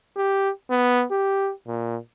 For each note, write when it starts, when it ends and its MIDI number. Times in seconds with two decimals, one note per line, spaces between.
0.16 0.50 67
0.70 1.04 59
1.11 1.51 67
1.67 1.97 46